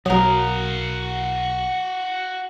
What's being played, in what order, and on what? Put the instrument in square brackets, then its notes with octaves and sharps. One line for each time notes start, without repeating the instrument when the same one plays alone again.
[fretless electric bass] B1 [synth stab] F#3 [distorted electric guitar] F#4 F5 [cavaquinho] A#4 D#6